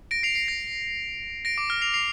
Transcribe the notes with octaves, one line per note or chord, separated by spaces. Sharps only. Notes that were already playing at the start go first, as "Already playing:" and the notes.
A#6 D7
C7 F7
C7
A#6
A#6 D7
D6
F6
C7 F7
C7 F7